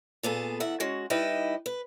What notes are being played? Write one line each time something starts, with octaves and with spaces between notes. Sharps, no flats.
A#2 B3 G#4 A4
E2 E5 F#5
G#3 C#4 F#4
G3 D#4 E4 B4 D#5
B4